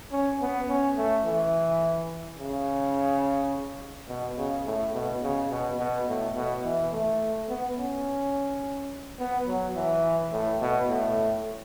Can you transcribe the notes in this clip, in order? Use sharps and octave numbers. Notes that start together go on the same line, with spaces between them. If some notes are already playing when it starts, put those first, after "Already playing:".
C#4
B3
C#4
A3
E3
C#3
B2
C#3
A2
B2
C#3
B2
B2
A2
B2
E3
A3
B3
C#4
B3
F#3
E3
A2
B2
A2